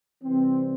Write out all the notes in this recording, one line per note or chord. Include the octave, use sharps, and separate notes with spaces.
C3 E3 G3 C4